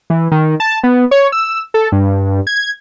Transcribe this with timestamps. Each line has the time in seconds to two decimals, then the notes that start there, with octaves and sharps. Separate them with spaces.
0.10 E3
0.32 D#3
0.60 A5
0.84 B3
1.11 C#5
1.32 E6
1.74 A4
1.92 G2
2.47 G#6